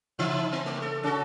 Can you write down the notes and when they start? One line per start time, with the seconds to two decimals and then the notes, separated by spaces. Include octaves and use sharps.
0.19 C#3 E3 D#4 E5
0.52 B3
0.66 A3
0.82 A4
1.03 C#4 F#4 A4